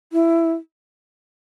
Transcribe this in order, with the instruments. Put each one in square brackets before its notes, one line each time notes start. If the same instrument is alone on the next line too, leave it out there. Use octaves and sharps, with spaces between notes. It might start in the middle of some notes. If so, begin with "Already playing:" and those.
[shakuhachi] E4